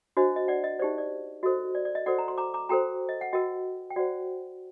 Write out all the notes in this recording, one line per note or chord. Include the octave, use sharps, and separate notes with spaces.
D4 F#4 C5 D#5
D#5
D5 F#5
D#5
D#4 G4 C5 D5
D5
F#4 A4 C5 D#5
D5
D5
D#5
F#4 A4 C5 D5 F#5
A#5
C6
A#5 D6
A#5 D6
F#4 A4 C5 G5 A#5
D#5
F#5
F#4 A#4 D#5 G5
G5
F#4 C5 D5 F#5